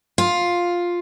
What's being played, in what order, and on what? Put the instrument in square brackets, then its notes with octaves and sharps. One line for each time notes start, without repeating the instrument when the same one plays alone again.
[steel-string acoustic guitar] F4